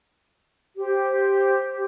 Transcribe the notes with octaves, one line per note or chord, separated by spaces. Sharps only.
G4 C5